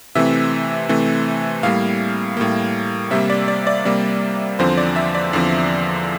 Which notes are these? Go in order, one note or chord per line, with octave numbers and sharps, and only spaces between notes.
C3 E3 A3 C4 E5
C3 E3 A3 C4
A2 G3 A#3 F5
A2 G3 A#3
C3 G3 A#3 E5
D5
D5
D5
C3 G3 A#3 D5
E2 D3 F3 C4 C5
D5
E5
D5
E2 D3 F3 C4